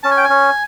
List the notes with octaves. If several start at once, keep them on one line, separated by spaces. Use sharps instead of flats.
C#4 A5
G#5
G5
G#5
C#4